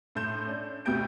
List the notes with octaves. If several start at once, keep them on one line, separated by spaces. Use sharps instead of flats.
A2 A3 C6 G6 E7
C#4 D4
D2 B2 B3 G4 G6 D7